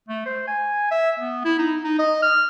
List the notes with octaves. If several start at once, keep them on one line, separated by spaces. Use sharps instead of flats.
A3
C5
G#5
E5
B3
E4
D#4
D#4
D#5
F6